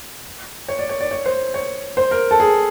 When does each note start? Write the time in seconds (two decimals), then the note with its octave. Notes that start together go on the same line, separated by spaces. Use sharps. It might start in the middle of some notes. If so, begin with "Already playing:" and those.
0.68 C#5
0.79 D5
0.89 C#5
1.01 D5
1.11 C#5
1.26 C5
1.54 C#5
1.97 C5
2.11 A#4
2.31 A4
2.40 G#4